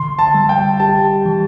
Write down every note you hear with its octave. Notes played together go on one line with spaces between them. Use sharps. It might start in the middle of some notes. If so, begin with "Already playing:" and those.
Already playing: D3 C6
A5
G3
G5
G4 A5
E3